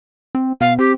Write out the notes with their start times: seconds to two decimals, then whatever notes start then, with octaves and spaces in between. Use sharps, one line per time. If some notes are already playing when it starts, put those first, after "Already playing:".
0.35 C4
0.61 B2 F5
0.79 C4 G4